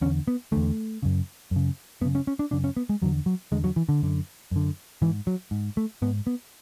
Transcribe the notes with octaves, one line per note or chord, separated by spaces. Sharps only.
E2 D3 C#4
B3
E2 D3 A3
F#2 C#3
F#2 C#3
F#2 C#3 B3
C#4
C#4
D4
F#2 C#3 D4
C#4
B3
G#3
E2 D3 F#3
F#3
E2 D3 G#3
F#3
E3
D3
F#2 D3
F#2 D3
G#2 E3
F#3
G#2
A3
G#2 B3
B3